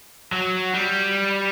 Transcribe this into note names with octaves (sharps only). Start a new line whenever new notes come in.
F#3
G3